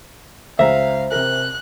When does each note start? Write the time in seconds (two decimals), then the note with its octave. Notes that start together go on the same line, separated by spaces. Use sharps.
0.59 C#2 C#3 C5 E5 F5 A#5
1.12 C3 A#4 F#6